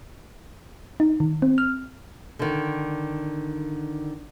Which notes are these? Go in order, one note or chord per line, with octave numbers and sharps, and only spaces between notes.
D#4
D#3
C4
F6
D3 D#3